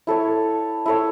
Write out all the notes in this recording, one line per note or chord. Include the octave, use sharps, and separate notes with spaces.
E4 A4 C#5
E4 A4 C#5